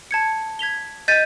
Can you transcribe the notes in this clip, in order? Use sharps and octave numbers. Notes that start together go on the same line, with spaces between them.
A5 G#6 C#7
G#6 B6 F7 G7
D#5 G6 A6 B6 D#7